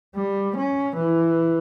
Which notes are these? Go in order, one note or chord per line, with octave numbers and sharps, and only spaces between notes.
G3
C#4
E3